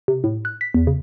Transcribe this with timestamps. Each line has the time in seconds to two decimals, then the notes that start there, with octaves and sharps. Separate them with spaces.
0.08 C3
0.24 A2
0.45 F#6
0.61 B6
0.74 E2
0.87 C#3